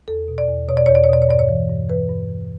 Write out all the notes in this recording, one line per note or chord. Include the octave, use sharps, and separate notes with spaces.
E2 A4
B2
D5
E2
B2 C#5
D5
E2 C#5
D5
C#5
B2 D5
C#5
G2 D5
C#5
E3
G2
E3 B4
G2
E3